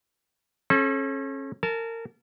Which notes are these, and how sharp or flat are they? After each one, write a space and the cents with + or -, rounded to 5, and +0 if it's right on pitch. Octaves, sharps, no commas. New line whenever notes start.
C#4 -35 A4 -35
A#4 -30 A5 -25